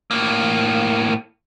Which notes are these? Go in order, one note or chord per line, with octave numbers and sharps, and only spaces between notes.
A2 A#3